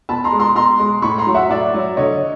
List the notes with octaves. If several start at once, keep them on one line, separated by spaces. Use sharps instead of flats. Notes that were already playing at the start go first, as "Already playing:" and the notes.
B2 A5 B5
A#5 C6
G#3
A#5 C6
B2 A#5 C6
G#3
A2 B5 C#6
A#5 C6
F#3
E5 F#5
A2 D5 E5
F#3
D3 C#5 D#5